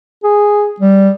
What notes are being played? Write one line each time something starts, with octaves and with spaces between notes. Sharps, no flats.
G#4
G3